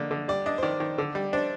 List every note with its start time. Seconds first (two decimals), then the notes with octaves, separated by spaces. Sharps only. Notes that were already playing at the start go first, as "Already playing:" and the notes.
Already playing: D3 A#3 D5
0.11 D3
0.28 G3 D5
0.46 D4 D#5
0.58 C5
0.62 D#3 D5
0.80 D#3
0.98 D3
1.15 G3
1.33 D4 C5